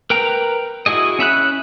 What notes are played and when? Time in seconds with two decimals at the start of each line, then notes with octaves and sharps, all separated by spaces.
0.10 A#4 B4 G5 A#5
0.86 E4 F#4 G#4 D#5
1.19 C#4 E5 B5 F#6